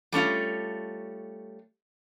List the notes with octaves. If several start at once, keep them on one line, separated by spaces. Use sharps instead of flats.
G3 A3 C#4 F4